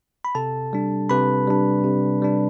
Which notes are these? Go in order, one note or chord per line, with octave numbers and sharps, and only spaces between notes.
B5
C3 A4 A5
G3 D4
C3 B4 B5
G3 D4
C3
G3 D4